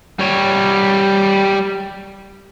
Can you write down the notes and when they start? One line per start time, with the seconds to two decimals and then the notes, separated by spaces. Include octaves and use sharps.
0.19 G3 C#5